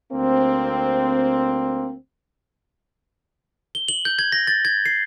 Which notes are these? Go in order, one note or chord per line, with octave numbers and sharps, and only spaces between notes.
D2 A#3 C4
G7
F#7
G6
G#6
A#6
A6
G#6
C7